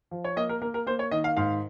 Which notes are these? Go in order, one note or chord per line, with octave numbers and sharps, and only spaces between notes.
F3
C#5
A#3 D#5
A#4
A#3 A#4
A#4
A#3 C5
C#5
D#3 D#5
F5
G#2 F5